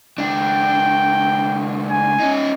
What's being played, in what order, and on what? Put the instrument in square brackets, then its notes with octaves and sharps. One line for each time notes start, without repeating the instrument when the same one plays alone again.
[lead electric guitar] C#2 D4 [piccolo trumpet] G5
[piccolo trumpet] G#5
[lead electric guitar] C#4 D#4